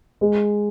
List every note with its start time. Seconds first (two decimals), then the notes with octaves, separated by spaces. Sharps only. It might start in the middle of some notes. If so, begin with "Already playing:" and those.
0.21 G#3